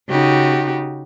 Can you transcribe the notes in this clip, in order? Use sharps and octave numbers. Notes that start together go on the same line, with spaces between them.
C#3 D#4 F#4 G4